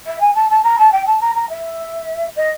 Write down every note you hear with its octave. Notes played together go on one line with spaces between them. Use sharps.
E5
G#5
A5
A5
A#5
A5
G5
A5
A#5
A#5
E5
D#5